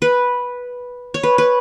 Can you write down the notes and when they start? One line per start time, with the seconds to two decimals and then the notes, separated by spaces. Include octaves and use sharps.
0.02 B4
1.14 C#5
1.23 B4
1.38 B4